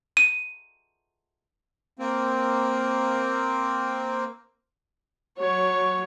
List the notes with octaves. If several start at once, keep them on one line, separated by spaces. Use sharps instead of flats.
D#7
A#3 C4
F#3 C#5